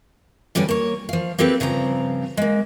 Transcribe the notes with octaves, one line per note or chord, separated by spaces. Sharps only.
G2 D3 G3 C#4 D5
A#3 C#5
F3 F5
A#3 C4 G4 A4 B4
G2 C#3 F3 C4 A#5
G#3 A#3